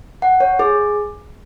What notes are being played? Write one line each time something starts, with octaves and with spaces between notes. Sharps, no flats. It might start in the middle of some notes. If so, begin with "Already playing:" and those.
F#5
C#5
G#4